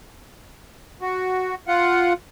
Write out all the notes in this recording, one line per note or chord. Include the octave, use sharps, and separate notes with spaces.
F#4
F4 F#5